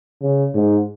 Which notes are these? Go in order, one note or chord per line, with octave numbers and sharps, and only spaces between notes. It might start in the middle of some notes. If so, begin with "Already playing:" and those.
C#3
G#2